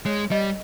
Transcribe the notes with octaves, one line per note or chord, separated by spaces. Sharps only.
G#3 C#5
G3 D#5